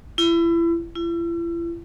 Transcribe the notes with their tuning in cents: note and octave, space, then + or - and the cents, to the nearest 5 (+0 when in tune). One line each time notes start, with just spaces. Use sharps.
E4 +30
E4 +40